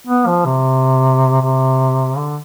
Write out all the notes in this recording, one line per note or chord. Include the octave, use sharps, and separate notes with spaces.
B3
F3
C3
C3
D3